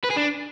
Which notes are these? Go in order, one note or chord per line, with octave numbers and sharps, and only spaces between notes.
B4
G#4
D4